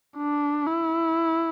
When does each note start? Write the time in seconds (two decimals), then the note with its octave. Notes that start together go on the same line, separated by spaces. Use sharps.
0.17 D4
0.67 E4